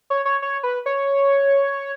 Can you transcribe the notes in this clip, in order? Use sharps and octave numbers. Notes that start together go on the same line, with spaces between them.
C#5
C#5
C#5
B4
C#5